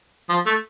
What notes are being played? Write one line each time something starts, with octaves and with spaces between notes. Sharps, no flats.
F3
A3